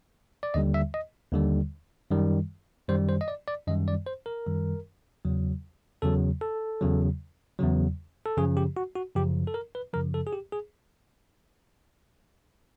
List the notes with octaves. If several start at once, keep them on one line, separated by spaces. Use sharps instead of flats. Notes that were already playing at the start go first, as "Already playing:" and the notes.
D5
D#2 D3 G3 D#5
E5
D#5
D#2 D3 G3
F#2 D#3 G3
F#2 D#3 G3 C5
C5
D#5
D5
D5
F#2 D#3 G3 D#5
D5
C5
A#4
F#2 D#3 G3
E2 C#3 F#3
E2 C#3 F#3 A4
A4
E2 C#3 F#3
E2 C#3 F#3
A4
F#2 C#3 F3 G#4
G4
F#4
F#4
F#2 C#3 F3 G4
A4
A#4
B4
F#2 C#3 F3 A#4
A4
G#4
G4
G#4